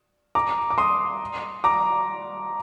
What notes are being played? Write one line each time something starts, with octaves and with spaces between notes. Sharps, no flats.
A#5 D6
D6
C6 D#6
A#5 D6